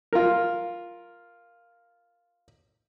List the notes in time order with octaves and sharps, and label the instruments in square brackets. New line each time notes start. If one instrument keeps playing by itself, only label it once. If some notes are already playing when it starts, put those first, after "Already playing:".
[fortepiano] F4 A#4